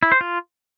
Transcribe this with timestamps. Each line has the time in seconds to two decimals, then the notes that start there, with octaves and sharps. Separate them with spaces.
0.03 E4
0.12 C5
0.21 F4